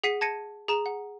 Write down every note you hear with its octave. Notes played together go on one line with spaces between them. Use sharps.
G#4 F#5 B6 C7 D#7
A5 G#6 A#6 C#7 D#7
G#4 A#5 E7
F#5